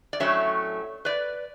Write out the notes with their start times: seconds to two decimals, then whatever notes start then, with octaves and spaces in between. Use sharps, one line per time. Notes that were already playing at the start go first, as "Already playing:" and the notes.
0.13 D5
0.20 A2 F#3 A3 C#4 C#5 E5
1.05 B4 D5